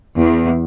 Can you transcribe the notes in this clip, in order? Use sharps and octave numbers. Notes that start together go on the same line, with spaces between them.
E2